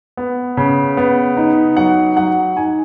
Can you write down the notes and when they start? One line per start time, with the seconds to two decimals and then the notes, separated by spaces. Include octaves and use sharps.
0.17 B3
0.57 C#3
0.97 B3
1.37 D#4
1.77 F#3 F#5
2.16 F#3 F#5
2.56 D#4 G#5